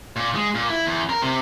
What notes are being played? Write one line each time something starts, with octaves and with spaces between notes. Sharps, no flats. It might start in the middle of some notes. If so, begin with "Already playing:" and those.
A#2
G#3
A#2
E4
E2
A#4
C3